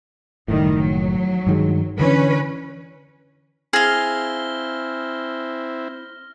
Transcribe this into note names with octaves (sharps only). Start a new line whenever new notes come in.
F#1 A2 D#3 G3
F#3
G2 D#3 G#3
D3 E3 C#4 D4 B4
C4 E4 G#4 F5 F6 A#6 G7